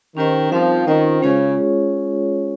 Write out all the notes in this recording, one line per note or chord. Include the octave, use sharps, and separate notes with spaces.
D#3 C#4 G4 C5 D#5
F3 G3 C4 D#4 A#4 F5
D#3 C#4 F4 C5 D#5
C#3 G#3 C#4 F4 G#4 C#5